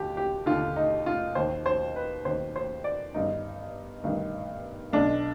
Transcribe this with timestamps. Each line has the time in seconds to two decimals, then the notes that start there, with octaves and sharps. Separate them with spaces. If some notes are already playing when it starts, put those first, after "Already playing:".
Already playing: D#2 D3 G4
0.17 G4
0.46 D#2 D3 F4
0.76 D#4
1.06 F4
1.35 D#2 D#3 C5
1.66 C5
1.96 B4
2.25 D#2 D#3 C5
2.56 C5
2.84 D5
3.14 G1 G2 D#3 D#4
4.04 G1 G2 D#3
4.93 B1 B2 D4